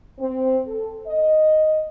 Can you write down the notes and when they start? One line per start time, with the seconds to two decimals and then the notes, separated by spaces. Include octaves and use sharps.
0.20 C4
0.67 A4
1.07 D#5